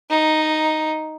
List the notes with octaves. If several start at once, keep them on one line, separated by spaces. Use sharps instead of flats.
D#4